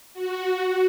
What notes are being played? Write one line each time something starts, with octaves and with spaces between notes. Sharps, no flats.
F#4